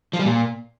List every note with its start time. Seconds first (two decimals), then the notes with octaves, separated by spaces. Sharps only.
0.13 F3
0.19 G3
0.25 A#2